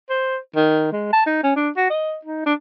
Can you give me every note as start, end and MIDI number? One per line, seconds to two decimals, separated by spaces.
0.09 0.37 72
0.56 0.90 51
0.92 1.12 56
1.13 1.21 81
1.26 1.41 63
1.43 1.53 61
1.56 1.69 62
1.77 1.89 66
1.90 2.17 75
2.25 2.44 63
2.46 2.53 62